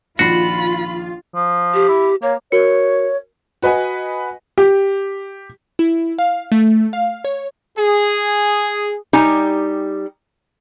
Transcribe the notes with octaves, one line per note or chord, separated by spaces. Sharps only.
A#1 D#3 F4 F#4 B5 C7
F3
G4
E4
A#3 C#5
F#4 A#4 C#5 C#7
F#4 B4 D#5 F#5 G#5
G4
E4
F5
A3
F5
C#5
G#4
G3 D#4 G4 G#5